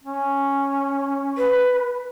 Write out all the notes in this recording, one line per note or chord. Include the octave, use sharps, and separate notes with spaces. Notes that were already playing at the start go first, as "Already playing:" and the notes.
C#4
B4